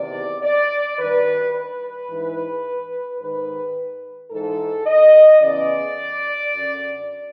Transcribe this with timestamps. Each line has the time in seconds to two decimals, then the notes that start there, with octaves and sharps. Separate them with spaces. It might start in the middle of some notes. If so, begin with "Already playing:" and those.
Already playing: E2 C3 D#3 D5
0.43 D5
0.98 G2 D#3 B4
1.53 B4
2.09 G#2 E3
3.19 G#2 D#3 B4
4.31 G#2 E3 A4
4.86 D#5
5.41 E2 C#3 E3 D5
6.52 F#2 D3